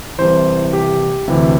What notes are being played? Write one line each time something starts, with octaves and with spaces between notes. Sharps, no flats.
C2 C3 E3 C5
G4
D2 C3 E3